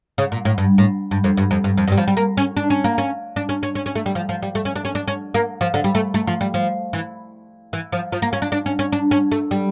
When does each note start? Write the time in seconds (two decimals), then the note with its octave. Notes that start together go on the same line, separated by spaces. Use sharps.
0.18 C#3
0.32 A#2
0.45 A2
0.58 G2
0.78 A2
1.11 G2
1.24 F2
1.37 G2
1.51 F2
1.64 G2
1.78 F2
1.88 G2
1.92 G3
1.98 F3
2.08 G3
2.17 A#3
2.37 C#4
2.57 D4
2.70 C#4
2.84 A#3
2.98 C#4
3.36 D4
3.49 C#4
3.63 C#4
3.75 C#4
3.86 C#4
3.96 A3
4.06 G3
4.15 F3
4.29 F3
4.43 G3
4.55 A3
4.65 C#4
4.76 D4
4.85 C#4
4.95 D4
5.08 C#4
5.34 A#3
5.61 F3
5.74 D3
5.84 G3
5.95 A3
6.14 A3
6.27 F3
6.41 G3
6.54 F3
6.93 E3
7.73 E3
7.92 F3
8.12 F3
8.22 A#3
8.33 C#4
8.42 D4
8.52 D4
8.66 C#4
8.79 C#4
8.92 D4
9.11 C#4
9.32 A3
9.51 G3